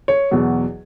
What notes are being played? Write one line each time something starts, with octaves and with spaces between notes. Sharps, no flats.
C#5
E2 B2 F#3